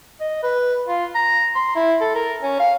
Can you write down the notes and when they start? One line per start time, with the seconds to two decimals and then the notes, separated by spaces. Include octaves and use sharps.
0.20 D#5
0.43 B4
0.88 F4
1.15 A#5
1.55 C6
1.76 E4
2.01 A4
2.15 A#4
2.42 C#4
2.59 F5